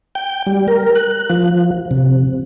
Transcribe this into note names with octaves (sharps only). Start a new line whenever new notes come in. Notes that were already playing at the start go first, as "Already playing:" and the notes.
G5
G3
A#4
F#6
F3
C3